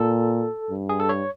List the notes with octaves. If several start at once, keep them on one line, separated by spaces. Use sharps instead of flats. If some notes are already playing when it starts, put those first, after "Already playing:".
Already playing: A#2 A4
G2
G#4
A4
C#5